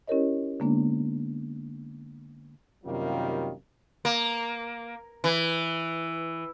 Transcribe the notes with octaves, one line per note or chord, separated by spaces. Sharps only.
C#4 E4 G4 A#4 C#5 D#5
D3 G#3 A#3 B3 D4
F#2 C3 D#3 G3 A#3 F4
A#3
E3